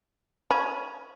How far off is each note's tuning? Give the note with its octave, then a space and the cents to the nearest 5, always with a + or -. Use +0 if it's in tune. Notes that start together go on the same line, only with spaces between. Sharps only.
C#4 +0 B5 -20